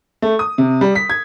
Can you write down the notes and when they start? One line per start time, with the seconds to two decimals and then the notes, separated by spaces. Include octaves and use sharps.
0.22 A3
0.39 D#6
0.58 C3
0.81 G3
0.95 B6
1.10 G#6